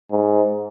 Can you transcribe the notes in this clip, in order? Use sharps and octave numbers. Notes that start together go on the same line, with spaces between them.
G#2